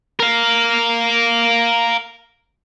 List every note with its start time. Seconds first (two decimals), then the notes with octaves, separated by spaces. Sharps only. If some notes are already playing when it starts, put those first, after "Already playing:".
0.20 A#4 F5